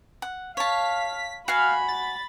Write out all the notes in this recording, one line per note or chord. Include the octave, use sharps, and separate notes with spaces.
F#5
C#5 F5 A5 B6
F#4 F5 F#5 G#5 B5
A6